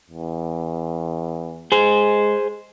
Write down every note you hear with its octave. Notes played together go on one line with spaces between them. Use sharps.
E2
G#3 G#4 C5